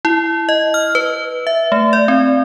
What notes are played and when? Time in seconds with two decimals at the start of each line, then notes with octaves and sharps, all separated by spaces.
0.05 E4
0.49 D#5
0.74 F6
0.95 B4
1.47 E5
1.72 A3
1.93 D5
2.08 C4